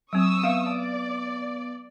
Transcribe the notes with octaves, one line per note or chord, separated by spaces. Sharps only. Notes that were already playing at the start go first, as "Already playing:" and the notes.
F#3 C4 C#6 D#6 E6
B3 E5 F5
D5